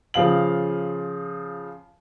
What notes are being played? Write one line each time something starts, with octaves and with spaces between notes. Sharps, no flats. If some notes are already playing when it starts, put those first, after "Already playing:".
C#3 F3 F5 F#7